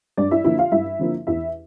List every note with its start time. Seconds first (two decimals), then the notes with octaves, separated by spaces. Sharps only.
0.17 G2 D4 D5
0.31 E4 E5
0.44 D3 F3 A#3 E4 E5
0.58 F4 F5
0.72 G2 E4 E5
0.99 D3 F3 A#3
1.27 E2 E4 E5